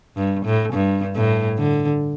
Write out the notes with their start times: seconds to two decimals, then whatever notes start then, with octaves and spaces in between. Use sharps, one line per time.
0.17 G2
0.45 A2
0.73 G2
1.16 A2
1.58 D3